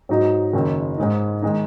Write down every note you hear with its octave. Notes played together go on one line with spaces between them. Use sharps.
G#2 F#3 D#4
F#1 F#2 D#3
G#2 G#3 D#4
D#3 G#3 D#4